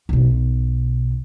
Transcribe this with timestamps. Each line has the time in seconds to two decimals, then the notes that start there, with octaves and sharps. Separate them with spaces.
0.09 B1 B2